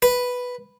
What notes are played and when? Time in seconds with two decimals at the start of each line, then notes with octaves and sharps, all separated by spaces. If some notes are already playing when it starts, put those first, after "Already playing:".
0.02 B4